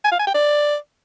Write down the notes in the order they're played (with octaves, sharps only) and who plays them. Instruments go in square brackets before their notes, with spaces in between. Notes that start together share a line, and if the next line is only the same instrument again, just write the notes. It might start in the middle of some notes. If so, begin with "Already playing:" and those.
[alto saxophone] G#5
F5
G#5
G5
D5